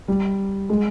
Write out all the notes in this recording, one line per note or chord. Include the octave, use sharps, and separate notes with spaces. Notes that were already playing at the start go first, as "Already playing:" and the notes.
G3
G#3